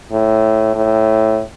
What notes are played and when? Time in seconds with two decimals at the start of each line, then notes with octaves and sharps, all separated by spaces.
0.12 A2
0.75 A2